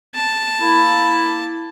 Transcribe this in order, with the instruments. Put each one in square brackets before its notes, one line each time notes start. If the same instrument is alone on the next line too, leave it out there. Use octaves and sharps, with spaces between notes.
[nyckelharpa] A5
[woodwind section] A#3 E4